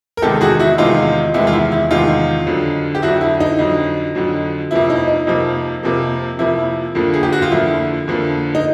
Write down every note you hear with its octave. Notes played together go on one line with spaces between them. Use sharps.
A#4
E2 C3 D#3 G#3 G4 A4
F#4 G#4
E4 F#4
E2 C3 D#3 G#3 D#4 F4
E2 C3 D#3 G#3 E4
F4
E4
E4
E2 C3 D#3 G#3 D#4 F4
F2 D3 F#3
G4
F2 D3 F#3 E4 F#4
E4
D#4
F2 D3 F#3
F2 D3 F#3
F2 C3 F3 A#3 E4
D#4
D#4
F2 C3 F3 A#3
F2 C3 F3 A#3
F2 C3 F3 A#3 E4
F2 D3 F3 A#3
G#4
G4
F#4
F4
F2 D3 F3 A#3 E4
F2 D3 F3 A#3
D#4